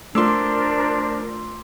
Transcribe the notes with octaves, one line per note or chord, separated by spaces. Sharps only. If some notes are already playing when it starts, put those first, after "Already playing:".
A3 D4 F4 A#4 C5 C6 D6 E6